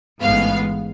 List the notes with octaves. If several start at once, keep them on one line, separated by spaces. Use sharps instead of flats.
A1 G#2 G#3 B3 F5